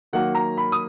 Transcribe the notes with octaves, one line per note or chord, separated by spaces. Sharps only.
D#3 F#3 A#3 F#5
A#5
B5
D#6